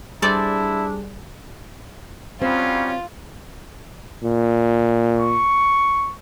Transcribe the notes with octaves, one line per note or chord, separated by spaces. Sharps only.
G3 D4 E4 G#4 A4 C5 D5
F#3 G3 C4 C#4 F4
A#2
C#6